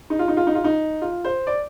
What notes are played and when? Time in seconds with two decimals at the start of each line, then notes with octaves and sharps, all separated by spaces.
0.10 D#4
0.19 F4
0.28 D#4
0.37 F4
0.47 D#4
0.55 F4
0.64 D#4
1.01 F4
1.25 C5
1.47 D5